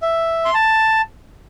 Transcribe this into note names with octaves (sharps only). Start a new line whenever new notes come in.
E5
C6
A5